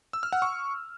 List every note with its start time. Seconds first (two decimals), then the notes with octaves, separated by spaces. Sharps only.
0.13 E6
0.23 F6
0.32 F#5
0.42 C#6